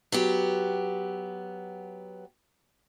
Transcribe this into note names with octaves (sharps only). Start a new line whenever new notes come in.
F#3 B3 G4